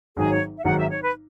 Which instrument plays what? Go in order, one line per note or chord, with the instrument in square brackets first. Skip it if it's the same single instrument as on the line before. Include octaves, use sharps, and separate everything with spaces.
[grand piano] G#1 G#2 D#3 F#3 [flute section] G#4
[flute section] D#5
C#5
E5
[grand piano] G#1 G#2 D#3 F#3 [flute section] F#5
[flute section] E5
C#5
B4